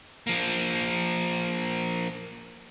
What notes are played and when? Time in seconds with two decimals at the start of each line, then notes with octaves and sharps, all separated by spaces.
0.27 F3 A#3